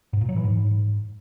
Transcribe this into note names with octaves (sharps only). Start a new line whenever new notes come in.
G#2
A#2
F#3
E3
G#2